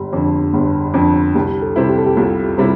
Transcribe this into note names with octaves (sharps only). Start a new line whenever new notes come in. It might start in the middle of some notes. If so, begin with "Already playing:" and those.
Already playing: G1 G4
F2 D3
G1
F2 D3
C2 G4
A4
C3 G3 C4 E4
G4
A4
G4
C2 F4
C3 G3 C4 E4